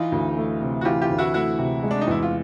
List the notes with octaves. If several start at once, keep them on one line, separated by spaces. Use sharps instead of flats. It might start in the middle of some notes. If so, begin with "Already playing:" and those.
Already playing: E3 D#4 F4
D2
A3
C3
F#4
E3 F4 G4
F4 G4
D2
E4 F#4
A3 E4 F#4
C3
G#3
D4
D#4
E2 E4
F4